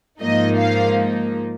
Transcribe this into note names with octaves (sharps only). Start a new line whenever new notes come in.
G#2 F3 A#3 D#4 D#5
F5